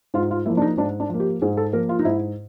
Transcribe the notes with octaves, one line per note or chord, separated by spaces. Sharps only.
G#2 F4
F4
F3 A#3 E4
D4
D#4
G#2 D4
D4
F3 A#3
G4
G#2 G#4
A4
F3 A#3 A#4
F4
D#4
G#2 E4